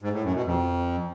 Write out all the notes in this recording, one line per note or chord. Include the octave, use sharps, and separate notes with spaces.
G#2
A2
F#2
B2
F2